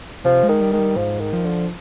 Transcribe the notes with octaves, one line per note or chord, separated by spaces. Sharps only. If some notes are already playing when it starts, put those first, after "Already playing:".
C3 F3
G#3
D#3
G3
D#3 G#3
G3
G#2 F3
D#3
F3
D3